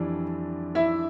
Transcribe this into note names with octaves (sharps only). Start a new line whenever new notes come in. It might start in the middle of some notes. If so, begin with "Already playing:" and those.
Already playing: F2 E3 G3 D4
E4 E5